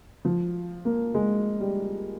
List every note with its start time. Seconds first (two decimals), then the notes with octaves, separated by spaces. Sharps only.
0.25 F3
0.85 A#3
1.14 G#3
1.60 G3